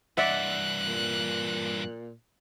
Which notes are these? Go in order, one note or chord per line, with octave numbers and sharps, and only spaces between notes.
G2 E3 D5 E5 F#5 F#6
A#2